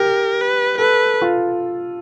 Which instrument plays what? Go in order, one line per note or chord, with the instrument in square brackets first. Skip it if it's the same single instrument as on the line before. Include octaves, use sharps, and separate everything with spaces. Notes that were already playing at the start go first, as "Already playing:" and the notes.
Already playing: [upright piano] G4 [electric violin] A#4
[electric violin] B4
[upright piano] A4 [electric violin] B4
[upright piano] F4